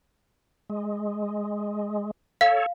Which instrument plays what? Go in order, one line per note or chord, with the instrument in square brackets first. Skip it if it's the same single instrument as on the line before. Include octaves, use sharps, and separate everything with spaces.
[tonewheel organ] G#3
[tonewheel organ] A4 C#5 [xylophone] F5